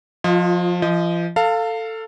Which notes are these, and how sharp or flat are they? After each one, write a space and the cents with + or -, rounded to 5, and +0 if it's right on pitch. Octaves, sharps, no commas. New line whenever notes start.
F3 +20 F4 -10 D#5 +0
F3 -35 D#5 +0
A4 +15 F5 +0 A5 +40